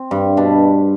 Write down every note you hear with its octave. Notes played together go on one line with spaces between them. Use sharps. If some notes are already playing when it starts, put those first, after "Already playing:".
Already playing: C4
G2
B2 D4